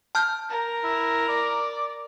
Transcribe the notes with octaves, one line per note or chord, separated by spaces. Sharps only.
A5 F6 G6
A#4
E4
D5